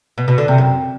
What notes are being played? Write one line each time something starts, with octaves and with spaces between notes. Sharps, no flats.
B2
B2
D3
C3
F#2